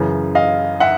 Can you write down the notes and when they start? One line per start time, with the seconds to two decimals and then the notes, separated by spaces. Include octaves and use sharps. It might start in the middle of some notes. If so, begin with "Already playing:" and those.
Already playing: F#2 C#3 E3
0.35 D#5 F5
0.80 E5 F#5